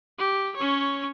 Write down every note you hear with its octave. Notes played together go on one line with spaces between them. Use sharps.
G4
C#4 C#5